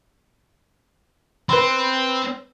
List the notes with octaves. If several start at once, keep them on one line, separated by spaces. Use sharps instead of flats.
C4 B4 C6